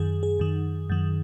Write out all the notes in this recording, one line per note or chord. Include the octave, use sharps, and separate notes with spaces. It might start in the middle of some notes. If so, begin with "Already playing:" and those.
Already playing: F#2 D#3 G#4
G#4
F#2 D#3
F#2 D#3